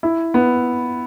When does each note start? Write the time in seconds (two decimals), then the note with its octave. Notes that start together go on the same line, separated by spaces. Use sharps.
0.03 E4
0.34 B3